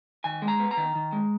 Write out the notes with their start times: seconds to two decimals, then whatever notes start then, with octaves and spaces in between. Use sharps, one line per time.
0.24 D#3 G#5
0.42 G#3
0.48 A#5
0.60 B3
0.71 A#5
0.77 D#3
0.95 D#3
1.13 G#3